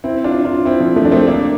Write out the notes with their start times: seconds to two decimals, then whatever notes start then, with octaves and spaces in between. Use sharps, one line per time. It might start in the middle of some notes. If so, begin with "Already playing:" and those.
0.04 C4 E4
0.24 D4 F4
0.45 D4 F4
0.65 C4 E4
0.80 D3 F3
0.96 F3 A3
1.05 D4
1.12 A3 C4
1.27 A#3 D4